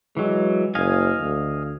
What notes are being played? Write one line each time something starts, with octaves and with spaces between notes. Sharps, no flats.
E3 F#3 G#3
F#1 D#5 F5 G#5
D2